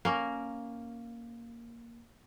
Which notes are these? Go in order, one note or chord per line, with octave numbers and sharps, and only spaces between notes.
A#3 C#4 A#4